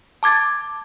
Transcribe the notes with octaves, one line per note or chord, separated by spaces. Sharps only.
A5 D6 G#6 A6